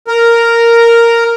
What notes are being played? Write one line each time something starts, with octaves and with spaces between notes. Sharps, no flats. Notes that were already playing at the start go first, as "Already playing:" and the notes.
A#4